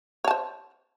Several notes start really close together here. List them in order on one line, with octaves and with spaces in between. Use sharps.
C#5 A5 C5